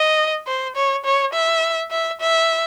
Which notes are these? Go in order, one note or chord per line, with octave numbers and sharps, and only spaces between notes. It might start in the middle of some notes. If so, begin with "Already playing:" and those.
Already playing: D#5
C5
C#5
C#5
E5
E5
E5